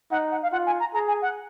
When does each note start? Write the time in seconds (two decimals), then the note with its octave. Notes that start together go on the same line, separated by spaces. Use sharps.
0.11 D#4 F#5
0.32 F#5
0.43 F5
0.52 F4 F#5
0.66 G#5
0.80 A#5
0.94 G#4 A#5
1.08 G#5
1.22 F#5